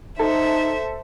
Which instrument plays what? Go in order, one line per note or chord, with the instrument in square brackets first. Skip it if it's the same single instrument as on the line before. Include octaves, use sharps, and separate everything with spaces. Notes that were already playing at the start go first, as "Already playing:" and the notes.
[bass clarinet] D#4 [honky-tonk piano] A4 [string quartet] C5 E5